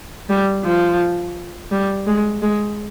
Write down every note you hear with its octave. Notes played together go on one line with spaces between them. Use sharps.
G3
F3
G3
G#3
G#3